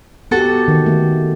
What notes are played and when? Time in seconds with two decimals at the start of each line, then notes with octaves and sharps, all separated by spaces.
0.31 B3 F#4 G4 A4
0.68 D#3
0.86 A3